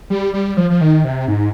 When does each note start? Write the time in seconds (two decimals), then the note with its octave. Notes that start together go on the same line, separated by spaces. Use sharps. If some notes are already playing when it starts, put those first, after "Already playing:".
0.10 G3
0.33 G3
0.57 F3
0.70 F3
0.81 D#3
1.05 C3
1.28 G#2